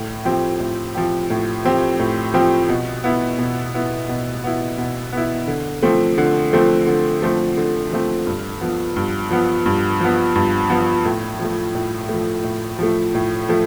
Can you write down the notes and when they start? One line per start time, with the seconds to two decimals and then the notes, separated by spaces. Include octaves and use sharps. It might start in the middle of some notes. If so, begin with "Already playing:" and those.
Already playing: A2
0.25 F3 C4 G4
0.60 A2
0.95 F3 C4 G4
1.30 A2
1.65 F3 C4 G4
2.00 A2
2.34 F3 C4 G4
2.69 B2
3.04 B3 E4
3.39 B2
3.74 B3 E4
4.09 B2
4.44 B3 E4
4.78 B2
5.12 B3 E4
5.48 D3
5.83 F3 A3 C4
6.18 D3
6.53 F3 A3 C4
6.87 D3
7.22 F3 A3 C4
7.57 D3
7.91 F3 A3 C4
8.27 G2
8.61 F3 B3
8.96 G2
9.31 F3 B3
9.66 G2
10.01 F3 B3
10.35 G2
10.70 F3 B3
11.05 A2
11.40 F3 A3
11.75 A2
12.09 F3 A3
12.44 A2
12.79 F3 A3
13.15 A2
13.49 F3 A3